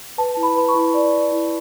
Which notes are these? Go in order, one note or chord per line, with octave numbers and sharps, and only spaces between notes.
B4 A5
E4
B5
B4 B5
C#6
E4
D5
D5
E4